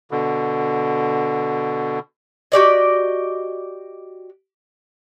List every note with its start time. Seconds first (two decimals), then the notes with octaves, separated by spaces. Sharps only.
0.11 B2 D3
2.52 F#4 G4 D5 D#5